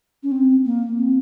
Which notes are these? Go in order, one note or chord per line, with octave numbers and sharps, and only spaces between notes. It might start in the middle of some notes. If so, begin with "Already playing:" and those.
C#4
C4
A#3
C4